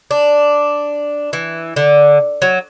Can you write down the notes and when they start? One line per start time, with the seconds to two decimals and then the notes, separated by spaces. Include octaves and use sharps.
0.11 D4
1.33 E3
1.76 D3
2.42 F#3